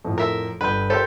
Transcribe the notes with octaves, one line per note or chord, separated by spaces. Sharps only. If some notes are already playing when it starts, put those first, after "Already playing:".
F2 A2
A#4 E5
G1 B4 G6
G4 A4 A#4 C5 E5